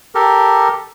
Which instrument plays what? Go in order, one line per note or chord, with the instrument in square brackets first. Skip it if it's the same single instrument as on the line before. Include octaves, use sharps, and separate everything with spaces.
[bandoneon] G4 A4 A#4